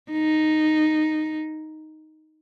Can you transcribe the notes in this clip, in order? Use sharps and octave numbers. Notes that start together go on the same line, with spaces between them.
D#4